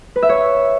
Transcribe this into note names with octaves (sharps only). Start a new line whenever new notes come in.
B4
E5
C#5